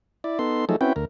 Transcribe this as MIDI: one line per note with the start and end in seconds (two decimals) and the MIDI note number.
0.24 0.39 64
0.24 0.39 74
0.39 0.65 59
0.39 0.65 63
0.39 0.65 69
0.39 0.65 84
0.69 0.76 53
0.69 0.76 54
0.69 0.76 57
0.69 0.76 63
0.69 0.76 68
0.69 0.76 69
0.81 0.93 60
0.81 0.93 61
0.81 0.93 64
0.81 0.93 66
0.81 0.93 71
0.81 0.93 79
0.96 1.05 38
0.96 1.05 70